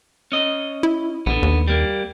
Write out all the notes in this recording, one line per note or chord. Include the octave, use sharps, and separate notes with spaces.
C#4 D#5
E4
A#1 D3 B3
D#2
G3 A#3